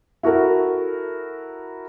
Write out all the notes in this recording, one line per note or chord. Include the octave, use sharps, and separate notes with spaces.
E4 F#4 A4 A#4